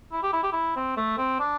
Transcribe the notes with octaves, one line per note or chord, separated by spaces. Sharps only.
E4
G4
E4
G4
E4
C4
A3
C4
D4